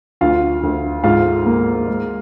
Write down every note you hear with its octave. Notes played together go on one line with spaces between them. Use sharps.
D2 F4 F5
D2
G#2 F4 F5
A#3
G#3